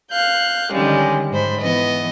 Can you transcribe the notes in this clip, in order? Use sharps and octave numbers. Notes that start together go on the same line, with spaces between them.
F5 F#6 G6
D3 D#3 G3 G#3 C#4
G#2 C5 B5
E3 B3 D#5